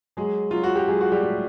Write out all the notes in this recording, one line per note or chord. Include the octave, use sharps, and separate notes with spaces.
F#3 G#3 G#4
F#3 F4
F#4
G4
F#3 G#3 G#4
F#4
G3 G4
A2